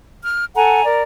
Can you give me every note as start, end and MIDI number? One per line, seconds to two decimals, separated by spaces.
0.23 0.46 89
0.55 0.83 69
0.55 0.83 78
0.55 0.83 80
0.55 0.83 82
0.85 1.02 70
0.85 1.02 74